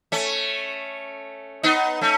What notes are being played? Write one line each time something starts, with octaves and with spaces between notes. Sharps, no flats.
A3 C#4
B3 D#4
A3 C#4